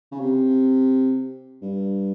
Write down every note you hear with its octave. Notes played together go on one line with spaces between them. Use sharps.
C#3
C3
G2